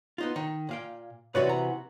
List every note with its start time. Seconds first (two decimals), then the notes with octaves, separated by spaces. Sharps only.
0.18 B3 D#4 F4
0.36 D#3
0.69 A#2 F5 G5
1.35 C3 E3 F#4 B4 C#5 D5
1.49 A#5